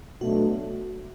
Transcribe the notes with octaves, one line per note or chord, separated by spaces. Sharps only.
B2 F#3 A3 D4 F#4